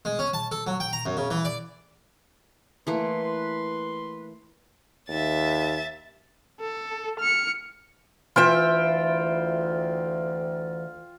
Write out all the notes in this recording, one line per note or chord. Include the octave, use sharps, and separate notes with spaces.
G#3
C#4
A5
A4
F#3
G5
A#5
F#2
C#3
E3
D5
E3 A3 A#3 B4 C6
D#2 E5 A6
A4
F6 C#7
D2 E3 F4 E5 G5